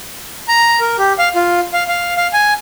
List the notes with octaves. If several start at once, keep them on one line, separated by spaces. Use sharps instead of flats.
A#5
A#4
G4
F5
F4
F5
F5
F5
G#5